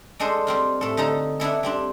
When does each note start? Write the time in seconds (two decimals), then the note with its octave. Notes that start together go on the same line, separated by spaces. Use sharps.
0.20 G#3 D4 A4 C5 D#5
0.47 G3 C4 F4
0.81 A2 A4
0.97 D3 D#4 A4 A#5
1.40 B3 D4 E4 A4
1.63 G3 C4 D4